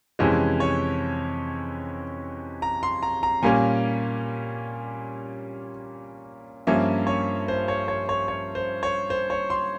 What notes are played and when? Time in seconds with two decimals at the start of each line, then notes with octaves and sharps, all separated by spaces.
0.19 F2 C3 E3 G#3 C#4
0.60 C#5
2.62 A#5
2.83 C6
3.03 A#5
3.23 A#5
3.42 A#2 G3 A#3 C#4 G#5
6.67 G2 F3 A#3 C#4 E5
7.07 C#5
7.48 C5
7.68 C#5
7.88 C#5
8.09 C#5
8.28 C#5
8.55 C5
8.83 C#5
9.10 C5
9.30 C#5
9.50 C6